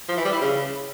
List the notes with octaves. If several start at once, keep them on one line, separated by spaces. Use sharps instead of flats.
F3
E3
G3
E4
C#3